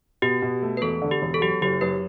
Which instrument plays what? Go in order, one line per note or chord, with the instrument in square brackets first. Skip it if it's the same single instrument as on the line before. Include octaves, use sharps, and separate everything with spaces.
[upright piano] B2 [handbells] G4
[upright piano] B2
A3
[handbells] B4
[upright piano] E1 [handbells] A4
[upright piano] D3
[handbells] G4
[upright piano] E1
[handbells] A4
[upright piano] F#3 [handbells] G4
[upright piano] F#1 [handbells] G4
[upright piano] F#2 [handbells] B4